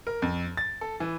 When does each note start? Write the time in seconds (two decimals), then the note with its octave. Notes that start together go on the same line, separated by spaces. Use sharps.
0.07 A#4
0.22 F2
0.57 A6
0.81 A4
1.00 E3